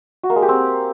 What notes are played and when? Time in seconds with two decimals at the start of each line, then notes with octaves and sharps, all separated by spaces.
0.23 F#4
0.30 A#3
0.36 G#3
0.42 G4
0.49 C4